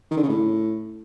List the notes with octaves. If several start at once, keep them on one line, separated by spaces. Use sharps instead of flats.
D#3
D3
C#3
A2